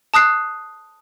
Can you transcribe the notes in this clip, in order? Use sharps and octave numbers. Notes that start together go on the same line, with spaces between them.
A5 D#6 F#6 C7